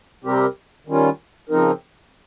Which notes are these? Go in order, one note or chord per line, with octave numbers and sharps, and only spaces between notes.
C3 G3 C4 G4 A#4
D#3 G3 C#4 F4
C#3 F3 C4 D#4 A#4